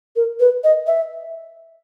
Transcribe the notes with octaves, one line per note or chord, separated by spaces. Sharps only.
A#4
B4
D#5
E5